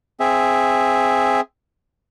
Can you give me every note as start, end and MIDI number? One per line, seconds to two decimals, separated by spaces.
0.20 1.41 60
0.20 1.41 68
0.20 1.41 76